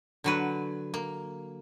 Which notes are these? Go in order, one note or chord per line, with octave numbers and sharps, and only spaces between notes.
D3 F#3 B4
A#3